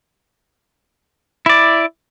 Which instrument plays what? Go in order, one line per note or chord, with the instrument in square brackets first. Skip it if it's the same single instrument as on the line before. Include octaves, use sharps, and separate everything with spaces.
[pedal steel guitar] E4 D5